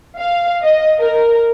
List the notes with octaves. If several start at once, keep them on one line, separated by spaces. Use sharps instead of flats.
F5
D#5
A#4